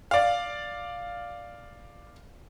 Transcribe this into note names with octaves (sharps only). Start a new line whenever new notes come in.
D5 F5